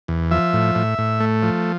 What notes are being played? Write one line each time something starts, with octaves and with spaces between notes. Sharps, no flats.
E2
F3 E5
A2
A2
A2
A3
F3